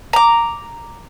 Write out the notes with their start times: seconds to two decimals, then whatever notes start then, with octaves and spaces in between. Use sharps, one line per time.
0.13 A#5 D6